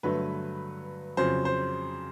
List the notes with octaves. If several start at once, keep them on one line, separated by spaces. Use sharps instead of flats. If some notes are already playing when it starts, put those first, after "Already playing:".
G2 D3 F#3 A3 B4
F2 C#3 F#3 C5
C5